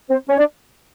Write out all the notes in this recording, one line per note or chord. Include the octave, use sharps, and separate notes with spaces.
C4 C5
C#4 C#5
D4 D5